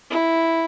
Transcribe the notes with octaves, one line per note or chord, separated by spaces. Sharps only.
E4